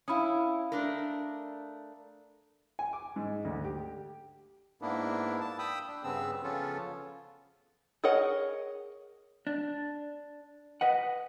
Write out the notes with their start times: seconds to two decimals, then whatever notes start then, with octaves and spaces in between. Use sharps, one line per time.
0.08 C#4 E4 F5 B5 D#6
0.72 A3 D4 A#4
2.79 G#5
2.93 D6
3.16 G#2
3.45 D2
3.65 G4
4.82 G#2 A#3 B3 D4 E4
5.41 A5
5.59 G5 B5 D#6 E6
5.87 D4
6.04 G2 C#3 B3 C4 E6
6.43 C#3 F3 B3 C#4 F4 A4
8.04 G#4 A#4 C#5 D#5 F#5
9.47 D4
10.81 B4 D#5 F#5